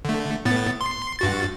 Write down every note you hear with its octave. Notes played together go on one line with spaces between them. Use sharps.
D3 A3
A2 B3 A6
C6
G2 F#4 A6